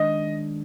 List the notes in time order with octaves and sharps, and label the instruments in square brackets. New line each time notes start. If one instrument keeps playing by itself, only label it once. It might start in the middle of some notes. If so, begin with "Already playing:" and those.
Already playing: [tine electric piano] D#3 G#3 D4 [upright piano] D#5